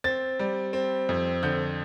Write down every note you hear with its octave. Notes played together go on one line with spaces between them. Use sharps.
C4 A6
G3
C4
F2
D3 G6